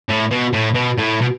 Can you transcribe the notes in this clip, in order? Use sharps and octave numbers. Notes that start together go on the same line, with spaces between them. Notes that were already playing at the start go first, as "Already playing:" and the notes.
A2
B2
A2
B2
A2
B2